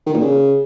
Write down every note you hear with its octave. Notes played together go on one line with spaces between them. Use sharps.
D#3
A#2
C#3